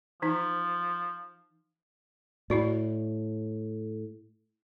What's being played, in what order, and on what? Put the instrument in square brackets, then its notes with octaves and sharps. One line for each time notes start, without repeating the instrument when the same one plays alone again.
[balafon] E3 D#4 [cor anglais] F3
[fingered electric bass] A2 [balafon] E4 F#4 D5